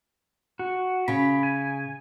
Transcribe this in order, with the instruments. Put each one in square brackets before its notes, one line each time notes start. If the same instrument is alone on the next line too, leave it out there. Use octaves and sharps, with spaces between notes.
[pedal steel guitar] F#4
[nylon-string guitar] C#3 [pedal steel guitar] B5
[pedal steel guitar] G#5